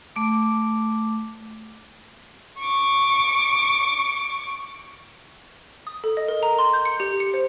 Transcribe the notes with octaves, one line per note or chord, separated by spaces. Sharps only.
A3 D6
C#6 D6
D#6
A4
D#5
A#4
A#5
C6
G6
C#7
G4
C#7
C5